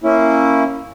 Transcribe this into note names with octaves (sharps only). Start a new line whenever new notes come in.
A#3 C#4 E4